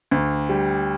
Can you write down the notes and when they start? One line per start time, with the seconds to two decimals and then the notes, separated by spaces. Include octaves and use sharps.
0.11 D2
0.49 G3